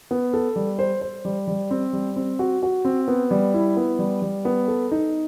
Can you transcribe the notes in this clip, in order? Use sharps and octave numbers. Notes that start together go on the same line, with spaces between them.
B3
A4
G3
C5
C5
G3
G3
C4
G3
C4
F#4
F#4
C4
B3
G3
E4
B3
G3
G3
B3
A4
D#4